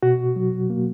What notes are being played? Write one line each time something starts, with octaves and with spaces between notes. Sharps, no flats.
B2 F#4
F#3
A#3